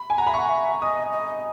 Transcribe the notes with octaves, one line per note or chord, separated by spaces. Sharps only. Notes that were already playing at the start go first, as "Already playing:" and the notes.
Already playing: B5
G#5
F#5 A#5
E5 B5
F#5 C#6
E5
D#5 D#6
D#5